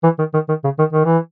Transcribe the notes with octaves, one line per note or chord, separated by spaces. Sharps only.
E3
D#3
D#3
D#3
C#3
D#3
D#3
E3